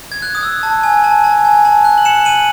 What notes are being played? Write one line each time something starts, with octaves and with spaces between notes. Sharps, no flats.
G#6
F#6
D#6
E6
A5
G#5
A5
A5
G#5
A5
F#6
F#7
C#7 E7
D#7 F#7